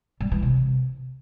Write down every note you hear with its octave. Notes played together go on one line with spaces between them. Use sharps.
G3
E3
C3